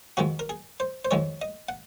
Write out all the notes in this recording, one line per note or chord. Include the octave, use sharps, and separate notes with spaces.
F2 D#3 G#3 F#4
A#4
G#4
C5
C5
F2 D#3 G#3 C#5
D#5
F#5